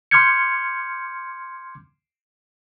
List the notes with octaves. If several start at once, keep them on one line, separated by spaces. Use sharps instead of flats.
C6 D6 F6 G6 G#6 C#7